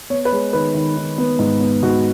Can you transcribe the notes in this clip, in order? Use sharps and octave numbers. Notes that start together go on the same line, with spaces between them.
B3 C#5
B4
G#3 C#5
D#3 B4
D#3
D#3
B3
G#2
B3
G#2 F#4